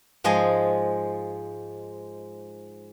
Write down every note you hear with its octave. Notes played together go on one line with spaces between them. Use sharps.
G#2 F3 G#3 D#5 G#5